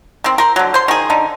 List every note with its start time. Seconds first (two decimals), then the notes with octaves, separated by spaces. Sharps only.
0.24 D#3 C4
0.38 A#4 C5
0.56 D3 F#3
0.74 C5 C6
0.88 D#3 G#4
1.10 D3 D#4